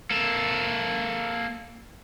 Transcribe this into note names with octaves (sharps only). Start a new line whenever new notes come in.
A#3 A4